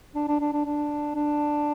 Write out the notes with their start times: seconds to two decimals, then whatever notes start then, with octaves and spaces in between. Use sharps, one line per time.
0.15 D4
0.28 D4
0.40 D4
0.53 D4
0.65 D4
1.15 D4